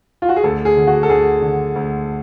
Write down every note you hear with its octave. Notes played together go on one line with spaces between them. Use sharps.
F4
F#4
G#4
D2 A4
G#4
D3
F#4
A4
D2 G#4
D3
D2